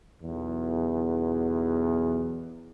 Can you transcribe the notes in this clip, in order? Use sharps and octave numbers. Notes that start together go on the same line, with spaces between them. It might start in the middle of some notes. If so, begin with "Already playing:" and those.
B1 E2